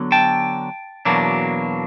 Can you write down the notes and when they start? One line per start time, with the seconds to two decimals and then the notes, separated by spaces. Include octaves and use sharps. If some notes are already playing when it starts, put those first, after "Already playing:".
Already playing: D3 F#3 B3
0.12 G5 A5
1.05 E2 B2 F#3 A#3 D4